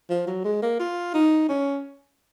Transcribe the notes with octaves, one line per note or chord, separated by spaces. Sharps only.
F3
F#3
G#3
A#3
F4
D#4
C#4